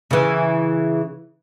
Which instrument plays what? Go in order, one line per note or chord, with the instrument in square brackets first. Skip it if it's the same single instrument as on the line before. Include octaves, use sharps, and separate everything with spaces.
[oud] C#3 E3